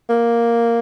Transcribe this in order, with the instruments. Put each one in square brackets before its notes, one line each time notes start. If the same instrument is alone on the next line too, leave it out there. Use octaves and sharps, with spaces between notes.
[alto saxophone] A#3